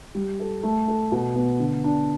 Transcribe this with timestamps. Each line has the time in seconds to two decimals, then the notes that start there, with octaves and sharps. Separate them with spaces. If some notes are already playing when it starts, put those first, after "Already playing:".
0.14 G3
0.40 A4
0.63 A3
0.88 A4
1.12 B2
1.35 B3
1.59 D3
1.84 D4